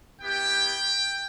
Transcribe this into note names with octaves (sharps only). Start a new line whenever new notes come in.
B3 E4 G4 G5